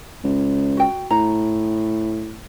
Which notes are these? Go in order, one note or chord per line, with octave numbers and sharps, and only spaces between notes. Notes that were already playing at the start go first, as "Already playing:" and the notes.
C#2
F#4 G5
A2 A#5